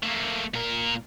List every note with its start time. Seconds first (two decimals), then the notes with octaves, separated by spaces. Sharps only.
0.03 A3 A#3
0.54 A#2 A#4